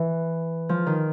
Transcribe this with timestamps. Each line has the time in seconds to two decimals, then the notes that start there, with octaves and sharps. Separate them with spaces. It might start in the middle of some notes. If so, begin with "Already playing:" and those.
Already playing: E3
0.69 F3
0.87 D#3